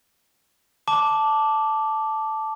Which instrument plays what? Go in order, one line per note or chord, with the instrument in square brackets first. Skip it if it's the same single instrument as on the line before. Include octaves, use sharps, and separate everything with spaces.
[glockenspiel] A5 D6